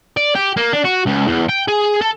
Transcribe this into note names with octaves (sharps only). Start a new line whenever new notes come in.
D5
G4
A#3
D4
F#4
C#2
E2
G5
G#4
A4